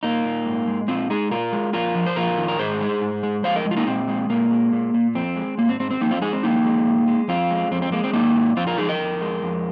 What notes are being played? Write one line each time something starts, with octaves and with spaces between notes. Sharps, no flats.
A#2 A#3 D#4
A#2
G#2
G#3
A#2 C4 F4
G#3 D#4 G#4
A#2 F4 A#4
G#3
F2 F4 A#4
F3
C5
F2 F4 A#4
D#3
A#4
G#2 G#4 C5
G#3
G#2
G#3
F2 C5 F5
A#4 D#5
G#3
F4
A#3 D#4
A#2 C4
G#3
A#2 A#3
G#3
A#2
A#2
F2 C4
G#3
G#2 A#3
C4
G#2 C4
C4
F2 A#3 D#4
C4 F4
G#3 D#4 G#4
C4
F2 A#3 D#4
G#3
A#2
G#3
F2 C4 F4
G#3
F2 C4
C4
G#3 A#3
C4
G#2 A#3 D#4
G#2
F2 C4 F4
F4 A#4
F3 D#4 G#4
A#4 D#5
F2
G#3
F2